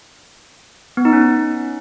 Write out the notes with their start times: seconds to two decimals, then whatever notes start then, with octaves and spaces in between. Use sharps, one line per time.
0.97 B3
1.05 D#4
1.13 C#4